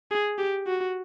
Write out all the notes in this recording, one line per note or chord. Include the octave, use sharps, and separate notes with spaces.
G#4
G4
F#4